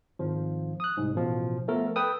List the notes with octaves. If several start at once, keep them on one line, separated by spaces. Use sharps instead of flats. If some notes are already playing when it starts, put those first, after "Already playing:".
G#1 F3
D#6 F#6
C2 G#2
A1 B2 F3
F3 A3 B3 A4 A#4
A4 B4 G5 D#6 E6